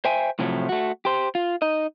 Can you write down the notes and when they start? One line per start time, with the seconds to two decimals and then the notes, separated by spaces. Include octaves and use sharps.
0.05 C5 E5 G5 G#5
0.39 A2 C3 F3 F#3 A3
0.69 A3 F#4
1.05 G4 C5
1.35 F4
1.62 D#4 D#5